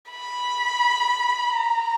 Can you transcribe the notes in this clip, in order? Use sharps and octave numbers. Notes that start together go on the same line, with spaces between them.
B5
A#5